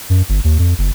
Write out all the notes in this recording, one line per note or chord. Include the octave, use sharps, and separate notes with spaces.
F#2
G1
D#2
F2
F#1